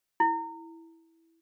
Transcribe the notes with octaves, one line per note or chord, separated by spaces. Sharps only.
E4